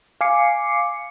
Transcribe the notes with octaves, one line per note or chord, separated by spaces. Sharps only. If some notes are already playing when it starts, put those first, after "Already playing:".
F5 G#5 D6 C7 C#7